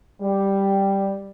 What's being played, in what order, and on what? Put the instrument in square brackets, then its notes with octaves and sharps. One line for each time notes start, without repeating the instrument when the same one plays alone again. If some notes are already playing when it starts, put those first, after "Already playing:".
[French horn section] G3